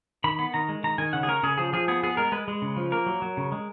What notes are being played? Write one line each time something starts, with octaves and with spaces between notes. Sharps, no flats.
D#3 B5
B3 B5
D#3 A#5
G#3
D#3 A#5
D#3 G#5
C#3 F#5
G#4
C#4 A#4
C#3 G#4
F3 G#4
F3 G#4
B3 G#4
B3 G#4
G#3 A#4
G#3 B4
G#3
C#3
F3
A#3 A#4
F#3
F#3
C#3
G#3